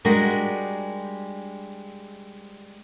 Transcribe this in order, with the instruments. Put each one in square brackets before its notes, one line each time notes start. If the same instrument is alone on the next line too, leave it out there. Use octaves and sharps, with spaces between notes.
[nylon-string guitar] G3 G#3 D4 F#4 G#4 A#4